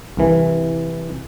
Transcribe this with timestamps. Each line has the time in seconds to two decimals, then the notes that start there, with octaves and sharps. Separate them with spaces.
0.17 C2 E3